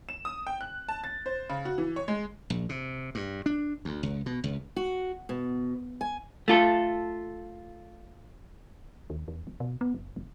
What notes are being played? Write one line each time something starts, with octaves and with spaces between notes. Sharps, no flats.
E7
D#6
G5
F#6
A5
A6
C5
C#3
F#4
E3
C#5
G#3
A#1
C3
G2
D4
D2
C#2
B2
C#2
F#4
B2
G#5
A3 F4 A4
D#2
E2
F1
B2
B3
F#1
F1